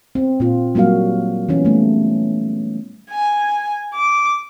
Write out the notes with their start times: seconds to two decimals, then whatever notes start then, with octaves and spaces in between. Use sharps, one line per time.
0.15 C4
0.40 A#2 C4 F4
0.75 F#3 G3 A#3 F#4 F5
1.49 E3 B3 C#4
1.65 G3 A3
3.10 G#5
3.94 D6